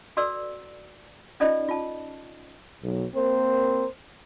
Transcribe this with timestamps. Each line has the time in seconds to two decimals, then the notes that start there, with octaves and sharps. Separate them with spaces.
0.17 F#4 A4 B4 D5 E6
1.40 C#4 D#4 F4 A4 D5 D#5
1.69 F4 A5
2.84 B1
3.15 A#3 C4 A#4 C5